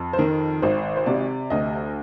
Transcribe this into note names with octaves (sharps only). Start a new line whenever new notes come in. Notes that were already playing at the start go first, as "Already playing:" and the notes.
Already playing: F2
C5
D#3 A#4
G#1 C5
C5
C3 D5
D2 D#5